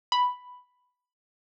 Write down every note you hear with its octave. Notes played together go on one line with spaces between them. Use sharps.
B5